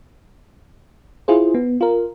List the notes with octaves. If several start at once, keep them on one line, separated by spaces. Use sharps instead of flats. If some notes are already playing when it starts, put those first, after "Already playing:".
E4 F4 G#4 C5
B3
F4 A#4